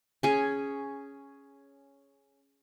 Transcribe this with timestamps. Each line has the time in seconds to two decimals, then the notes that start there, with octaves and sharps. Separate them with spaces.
0.23 C#4 G#4